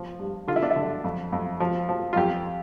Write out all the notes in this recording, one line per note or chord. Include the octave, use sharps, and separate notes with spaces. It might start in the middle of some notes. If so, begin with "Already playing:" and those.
Already playing: F3
G2
D3 F4
E4
D4
E4
D3
F2
F2
F3
F3
F4
F2 G4